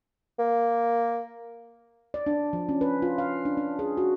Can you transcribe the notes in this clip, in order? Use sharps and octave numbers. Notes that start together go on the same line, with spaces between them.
A#3
D5
D4
F3
C#4
B4
F4
F5
D4
D4
G#4
F#4